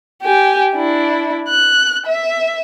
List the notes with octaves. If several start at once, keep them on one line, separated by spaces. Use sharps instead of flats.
G4 G#5
D4 E4
F#6
E5